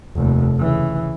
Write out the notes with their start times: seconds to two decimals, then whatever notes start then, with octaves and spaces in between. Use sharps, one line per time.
0.15 F1 D#2
0.58 C#3 E3